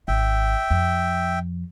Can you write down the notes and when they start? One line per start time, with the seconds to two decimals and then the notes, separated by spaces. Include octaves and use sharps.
0.08 G#1 E5 G5
0.71 F2